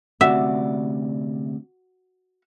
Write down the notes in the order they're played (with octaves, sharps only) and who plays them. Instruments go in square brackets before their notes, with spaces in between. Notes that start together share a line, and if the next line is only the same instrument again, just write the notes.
[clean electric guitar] D2 C3 D5 [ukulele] F#4 [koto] E5